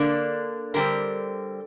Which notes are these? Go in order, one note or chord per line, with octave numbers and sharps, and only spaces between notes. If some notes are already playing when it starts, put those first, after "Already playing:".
Already playing: D3 A#3 D4
D3 G3 C4 A#4